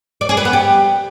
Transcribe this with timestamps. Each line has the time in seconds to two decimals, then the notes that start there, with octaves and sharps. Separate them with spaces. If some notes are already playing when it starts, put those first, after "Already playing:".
0.21 D5
0.29 G#4
0.37 B4
0.45 B3
0.53 G4